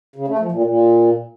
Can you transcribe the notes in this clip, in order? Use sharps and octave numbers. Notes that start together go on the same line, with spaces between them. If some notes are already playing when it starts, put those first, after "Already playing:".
C#3
A3
F3
A#2
A#2